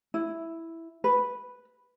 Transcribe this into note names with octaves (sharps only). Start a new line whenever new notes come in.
E4
B4